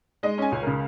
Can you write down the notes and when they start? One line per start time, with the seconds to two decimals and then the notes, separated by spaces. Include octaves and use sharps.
0.23 G#3 D#5
0.38 C#4 G#5
0.52 C#2
0.62 C#3 A#4